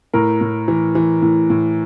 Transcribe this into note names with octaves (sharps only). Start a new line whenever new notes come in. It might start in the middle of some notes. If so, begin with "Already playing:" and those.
A2 A#4
A2
E3
E3
A2
A2